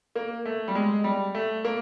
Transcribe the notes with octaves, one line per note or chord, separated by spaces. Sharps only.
A#3
A3
G3
G#3
G3
A3
A#3